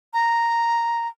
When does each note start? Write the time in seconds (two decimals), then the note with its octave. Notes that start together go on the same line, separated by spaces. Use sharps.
0.14 A#5